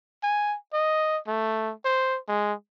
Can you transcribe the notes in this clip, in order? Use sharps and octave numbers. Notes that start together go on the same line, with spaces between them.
G#5
D#5
A3
C5
G#3